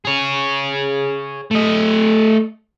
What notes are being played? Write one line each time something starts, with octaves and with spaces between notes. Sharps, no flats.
G#4 C#5
A3 D#5